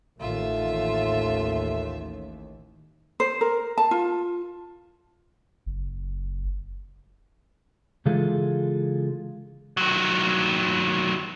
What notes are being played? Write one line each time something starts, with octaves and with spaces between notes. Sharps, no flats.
A1 D#2 A3 F4 E5
C5
A#4
A5
F4
F#1
C#3 E3 G#3 F4 G#4 A4
D#3 F#3